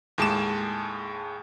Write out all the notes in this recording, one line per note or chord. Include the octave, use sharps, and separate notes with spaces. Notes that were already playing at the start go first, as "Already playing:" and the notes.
D#2 A2 G#3 A5 D6 E7